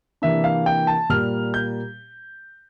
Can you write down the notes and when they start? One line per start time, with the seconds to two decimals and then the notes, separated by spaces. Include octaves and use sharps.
0.22 C3 E3 A#3 D4 E5
0.44 F5
0.66 G5
0.87 A5
1.09 A#2 G3 A#3 F6
1.54 G6